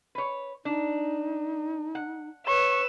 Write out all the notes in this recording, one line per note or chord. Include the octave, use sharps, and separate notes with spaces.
B4 C#5
D4 D#4
F#5
B4 C#5 C#6 E6